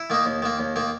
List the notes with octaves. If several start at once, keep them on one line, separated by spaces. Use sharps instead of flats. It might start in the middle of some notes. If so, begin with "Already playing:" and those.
Already playing: E4
D#3 A#3 D#4
D#2
D#3 A#3
D#2
D#3 A#3